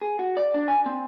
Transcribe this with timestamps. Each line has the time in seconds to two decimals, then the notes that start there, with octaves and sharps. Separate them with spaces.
0.01 G#4
0.19 F#4
0.37 D5
0.54 D4
0.68 G#5
0.86 C4